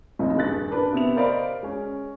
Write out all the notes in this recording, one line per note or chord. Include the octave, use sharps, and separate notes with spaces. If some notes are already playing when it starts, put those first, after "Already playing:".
F1 C#2 C#3 D#4
D#1 G2 G#4 F#6 A6
D4 A#4 B4
C3 B3 E5 F7
A#4 C5 D5 D#5 F5 B5
G#3 C#4